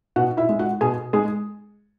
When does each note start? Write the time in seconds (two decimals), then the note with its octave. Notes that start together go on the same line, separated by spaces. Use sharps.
0.16 B2 F#4 F#5
0.37 E4 E5
0.49 G#3
0.59 F#4 F#5
0.81 B2 G#4 G#5
1.13 G#3 G#4 G#5